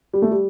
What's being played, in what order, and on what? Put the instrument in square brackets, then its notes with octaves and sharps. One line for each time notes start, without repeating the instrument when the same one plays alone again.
[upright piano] G3
A3
G3